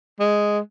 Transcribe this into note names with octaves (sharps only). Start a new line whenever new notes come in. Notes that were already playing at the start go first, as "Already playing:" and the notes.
G#3